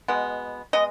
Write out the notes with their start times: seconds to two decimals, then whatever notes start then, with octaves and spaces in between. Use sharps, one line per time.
0.08 B2 G#3 B3
0.73 G#3 B3 D#5